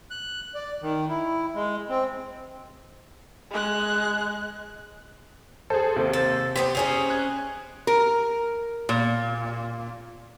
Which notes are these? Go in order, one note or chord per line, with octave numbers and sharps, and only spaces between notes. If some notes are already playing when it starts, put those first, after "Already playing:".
F#6
D5
D#3
E4
G#3
C4
G#3 F#6
G#4 A4 C5
D#2 C3
A4
B3 C4 G4 C5 B6
C4 C#4 D#4 G#4 D#6 F7
F#6 G#6
A#4
A#2